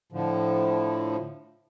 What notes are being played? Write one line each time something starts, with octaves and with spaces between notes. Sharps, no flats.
A2 D3 F3